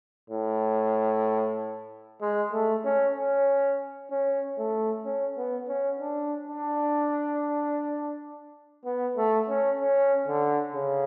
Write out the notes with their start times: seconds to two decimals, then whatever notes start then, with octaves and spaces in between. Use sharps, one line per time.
0.30 A2
2.20 G#3
2.52 A3
2.84 C#4
3.15 C#4
4.10 C#4
4.58 A3
5.05 C#4
5.37 B3
5.68 C#4
6.00 D4
6.48 D4
8.85 B3
9.17 A3
9.48 C#4
9.80 C#4
10.27 D3
10.75 C#3